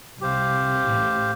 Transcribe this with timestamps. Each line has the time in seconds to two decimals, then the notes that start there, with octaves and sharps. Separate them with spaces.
0.21 C2 C3 G4 C5 F5
0.89 A1 A2